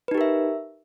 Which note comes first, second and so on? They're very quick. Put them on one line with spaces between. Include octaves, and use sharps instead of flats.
B4 D#4 G4 A#4 E5